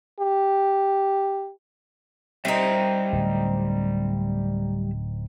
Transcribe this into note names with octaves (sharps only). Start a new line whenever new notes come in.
G4
G3 C4 D#4 E5
D1